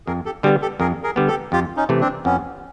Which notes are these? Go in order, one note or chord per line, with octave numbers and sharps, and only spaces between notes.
F2 G#4 A#4
G4 A4
D3 G3 B3 F#4 G#4
G4 A4
F2 G#4 A#4
G#4 A#4
D3 G3 B3
G4 A4
F2 F4 G4
C#4 D#4
C3 E3 A3
C4 D4
F2 B3 C#4